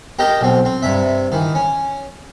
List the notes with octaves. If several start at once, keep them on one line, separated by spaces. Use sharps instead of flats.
G4 A#4 D#5 G5 A5
B1 C4
C4
G2 C3 E5
D#3 E3
C#4